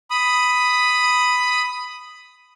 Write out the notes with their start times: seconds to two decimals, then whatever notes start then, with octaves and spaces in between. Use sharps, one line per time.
0.10 B5 D#6